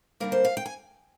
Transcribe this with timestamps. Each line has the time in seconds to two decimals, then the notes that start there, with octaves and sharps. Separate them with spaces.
0.20 D3 G3 A#3 A#4
0.32 C5
0.45 F5
0.57 G5
0.66 G#5